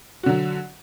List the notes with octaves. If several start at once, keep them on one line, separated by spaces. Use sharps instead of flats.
D3 F#3 F#4